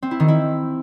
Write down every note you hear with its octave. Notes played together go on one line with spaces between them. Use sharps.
C4
E4
D#3
E4